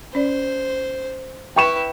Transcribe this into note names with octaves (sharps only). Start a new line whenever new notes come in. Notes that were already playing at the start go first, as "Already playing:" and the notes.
C#4 C5 D5
E4 B4 G5 C#6 E7